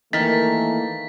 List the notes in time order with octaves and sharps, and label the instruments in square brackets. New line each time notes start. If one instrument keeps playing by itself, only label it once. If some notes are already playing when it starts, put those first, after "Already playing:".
[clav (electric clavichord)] D#3 A#4 [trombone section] E3 A3 A#3 [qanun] D#4 [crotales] A6 B6